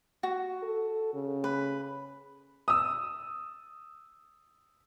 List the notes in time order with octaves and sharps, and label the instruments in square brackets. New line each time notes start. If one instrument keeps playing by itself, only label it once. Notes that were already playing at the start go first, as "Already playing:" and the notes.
[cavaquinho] F#4
[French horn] A4
C#3
[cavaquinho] B4
[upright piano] D#6 E6